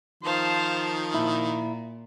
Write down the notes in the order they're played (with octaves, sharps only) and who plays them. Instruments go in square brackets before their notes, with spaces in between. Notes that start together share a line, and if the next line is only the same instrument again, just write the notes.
[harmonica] D#3 F3 [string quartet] C5 F5 A5
[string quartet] A#2 [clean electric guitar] E4